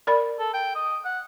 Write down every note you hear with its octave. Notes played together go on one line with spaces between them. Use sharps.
A#4 D5 B5
A4
G5
D#5
F#5